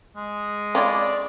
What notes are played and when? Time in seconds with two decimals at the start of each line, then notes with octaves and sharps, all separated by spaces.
0.16 G#3
0.75 C#4 E4 F4 D5